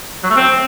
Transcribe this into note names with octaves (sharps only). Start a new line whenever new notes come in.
F#3
A3
C4